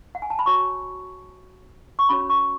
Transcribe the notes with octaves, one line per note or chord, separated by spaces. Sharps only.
F#5
G#5
A5
B5
F#4 C#5 C#6
C#6
C#4 F#4 C#5 B5
C#6